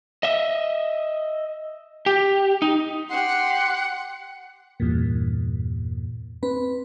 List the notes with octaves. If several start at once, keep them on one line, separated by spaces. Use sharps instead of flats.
D#5 E5
G4
D#4
G4 F#5 C6
E2 G2 A#2
C4 B4